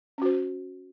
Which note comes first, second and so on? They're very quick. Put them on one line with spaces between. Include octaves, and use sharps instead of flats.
C#4 F#4 C5